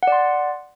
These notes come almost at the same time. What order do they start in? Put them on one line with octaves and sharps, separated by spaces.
F#5 D5 C6